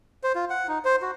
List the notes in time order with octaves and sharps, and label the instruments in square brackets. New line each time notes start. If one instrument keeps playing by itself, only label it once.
[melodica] C5
F4
F#5
D#4
C5
F#4